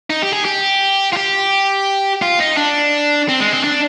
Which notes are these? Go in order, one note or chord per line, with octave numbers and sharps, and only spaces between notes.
D#4
G4
G#4
G4
F4
G4
F4
D#4
D4
C4
G#3
C4
D4